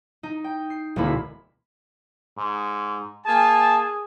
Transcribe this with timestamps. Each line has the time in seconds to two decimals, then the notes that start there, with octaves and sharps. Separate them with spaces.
0.23 D#4
0.44 G5
0.70 C7
0.96 E1 D2 A#3 C4 E4 B5
2.38 G#2
3.26 A#3 G#4 G#5 A5